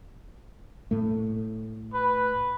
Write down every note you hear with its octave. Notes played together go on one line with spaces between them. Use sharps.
A2 A3
B4